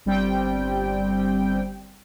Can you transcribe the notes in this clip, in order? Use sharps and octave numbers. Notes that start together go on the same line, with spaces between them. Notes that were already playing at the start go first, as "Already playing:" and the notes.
G1 G3 C4 G5